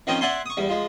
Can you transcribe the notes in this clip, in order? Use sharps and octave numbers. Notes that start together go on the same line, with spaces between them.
D#3 F3 C4 C#4 D#5 G5
D5 E5 F#5 G#5 A5 C6
C#6 D#6
E2 G3
F3 G#3